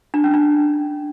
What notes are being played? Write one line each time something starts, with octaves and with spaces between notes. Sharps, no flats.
D4
C#4
D4